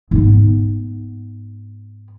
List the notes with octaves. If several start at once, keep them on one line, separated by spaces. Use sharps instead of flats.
G#2 B3